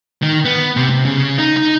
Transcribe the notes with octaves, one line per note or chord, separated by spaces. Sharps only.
D#3
B3
C3
C3
C#3
D#4
D#4